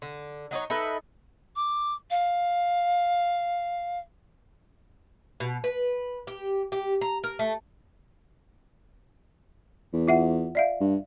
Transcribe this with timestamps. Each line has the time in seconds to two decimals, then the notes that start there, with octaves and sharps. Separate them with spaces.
0.02 D3
0.51 F#3 D#4 E4 C#5
0.70 D#4 A4 B4 E5
1.56 D6
2.10 F5
5.40 B2
5.64 B4
6.27 G4
6.72 G4
7.01 A#5
7.24 A#4
7.39 A3
9.93 E2
10.08 F4 E5 F#5
10.55 D5 E5 F5
10.80 G2